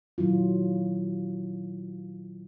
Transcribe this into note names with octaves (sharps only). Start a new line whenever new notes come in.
A#2 D#3 F#3 E4 F4